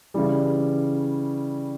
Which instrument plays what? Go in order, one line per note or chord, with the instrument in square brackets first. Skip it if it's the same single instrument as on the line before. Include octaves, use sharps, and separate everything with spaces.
[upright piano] C#3 E3 G3